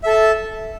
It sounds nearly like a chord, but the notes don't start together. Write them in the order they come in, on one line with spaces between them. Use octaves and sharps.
E5 A4 A5